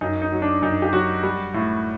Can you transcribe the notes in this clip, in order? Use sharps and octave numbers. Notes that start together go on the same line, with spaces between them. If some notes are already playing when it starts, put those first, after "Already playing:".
F#2 D#4
D#4
F#3
D4
F#2 D#4
G4
F#3 F#4
G3
A2